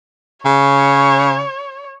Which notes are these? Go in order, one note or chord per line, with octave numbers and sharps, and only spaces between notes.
C#3 C#5